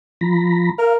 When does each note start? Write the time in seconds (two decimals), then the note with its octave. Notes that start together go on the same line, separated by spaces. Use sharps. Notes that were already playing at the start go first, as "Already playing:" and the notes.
0.21 F3 A#5 B5
0.78 A#4 F5